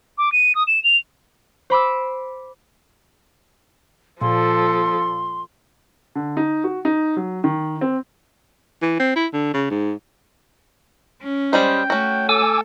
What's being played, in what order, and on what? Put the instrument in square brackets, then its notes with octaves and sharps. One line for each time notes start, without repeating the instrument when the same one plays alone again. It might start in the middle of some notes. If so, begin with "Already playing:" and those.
[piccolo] D6
D#7
D#6
E7
F7
[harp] C5 B5 D6 E6
[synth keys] A#2 [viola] F3 A4 [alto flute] C6
[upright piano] D3
D#4
F#4
D#4
F#3
D#3
C4
[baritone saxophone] E3
C4
E4
D3
C#3
G#2
[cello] C#4
[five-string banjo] G3 G#3 C5 [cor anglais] G5
[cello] A3 [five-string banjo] C#4 F#4
[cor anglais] A4 [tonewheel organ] G#5 D6 E6